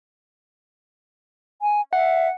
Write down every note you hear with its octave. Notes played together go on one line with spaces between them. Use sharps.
G#5
E5 F#5